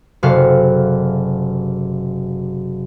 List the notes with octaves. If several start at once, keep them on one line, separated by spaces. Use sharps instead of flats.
F#1 C3 F#4 A4 F5